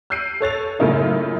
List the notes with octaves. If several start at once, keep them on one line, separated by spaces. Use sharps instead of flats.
E6 F#6 G6 C7 D7 D#7
A4 C#5 A6 F7
F#2 A2 C#3 A#3 D#4 F4